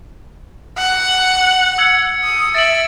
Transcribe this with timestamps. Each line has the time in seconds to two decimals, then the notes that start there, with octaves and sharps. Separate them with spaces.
0.78 F#5
1.78 E6 G#6 C#7
2.24 D#6
2.55 E5 A6 D7 F#7